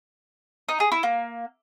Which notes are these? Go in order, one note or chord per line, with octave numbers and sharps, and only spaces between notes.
D#4
G#4
E4
A#3